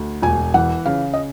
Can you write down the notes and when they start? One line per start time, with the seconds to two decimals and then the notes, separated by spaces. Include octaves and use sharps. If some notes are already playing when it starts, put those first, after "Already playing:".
Already playing: D2
0.22 E1 G#5
0.54 E3 F#5
0.86 C#3 F5
1.14 D#5